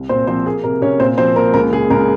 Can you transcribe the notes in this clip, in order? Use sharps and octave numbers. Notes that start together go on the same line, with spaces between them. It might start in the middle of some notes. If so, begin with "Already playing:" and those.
Already playing: C2
A#2 C4 C5
F3 C4 C5
A#3 G#4
C3 A#4
C3 C#4 C#5
A#2 C4 C5
F3 C4 C5
A#2 A#4
C#2 A#4
C#3 G#4
C#2 A#4